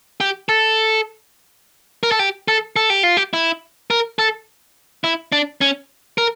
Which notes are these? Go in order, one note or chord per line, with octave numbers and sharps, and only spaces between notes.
G4
A4
A#4
A4
G4
A4
A4
G4
F4
G4
E4
A#4
A4
E4
D4
C#4
A#4